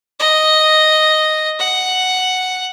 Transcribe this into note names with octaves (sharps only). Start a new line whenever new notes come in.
D#5
F#5